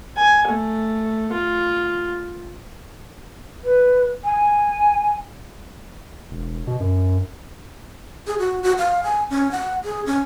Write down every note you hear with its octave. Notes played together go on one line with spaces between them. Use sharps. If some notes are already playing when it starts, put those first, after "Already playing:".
G#5
A3
F4
B4
G#5
E1
B2
F#2
G#4
F#4
F#4
F5
G#5
C#4
F#5
G#4
C#4